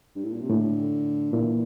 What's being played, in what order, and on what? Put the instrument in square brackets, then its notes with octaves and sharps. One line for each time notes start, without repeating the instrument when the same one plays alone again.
[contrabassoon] G2
A2
A#2
C3
[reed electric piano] A2 [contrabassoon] D3
[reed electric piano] A#2 [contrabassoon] E3